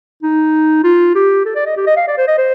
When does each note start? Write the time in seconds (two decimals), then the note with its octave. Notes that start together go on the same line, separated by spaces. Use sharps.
0.23 D#4
0.84 F4
1.15 G4
1.45 A4
1.55 D5
1.66 D#5
1.76 G4
1.87 D#5
1.96 F5
2.08 D5
2.18 C5
2.28 D#5
2.38 C5